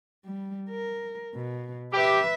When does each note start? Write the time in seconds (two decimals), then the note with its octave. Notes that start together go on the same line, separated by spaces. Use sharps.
0.25 G3
0.69 A#4
1.34 B2
1.93 G4 B4 E5